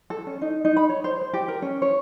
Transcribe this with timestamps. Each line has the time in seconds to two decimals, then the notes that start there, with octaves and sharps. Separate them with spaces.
0.10 A4
0.27 C#4
0.41 D#4
0.65 D#4
0.77 B5
0.89 C#5
1.04 C5
1.22 C5
1.33 G4
1.48 A#4
1.62 C#4
1.82 C#5